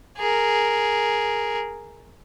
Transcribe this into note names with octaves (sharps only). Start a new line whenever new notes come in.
G#4 A#4